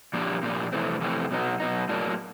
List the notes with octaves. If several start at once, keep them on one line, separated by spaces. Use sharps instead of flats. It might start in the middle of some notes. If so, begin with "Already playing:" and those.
A#2 F3 A#3 D4 G4
A#2 F3 A#3 D4 G4
F2 C3 E3 A3 C4
F2 C3 E3 A3 C4
B2 F#3 B3 D#4
B2 F#3 B3 D#4
A2 F#3 A#3 D4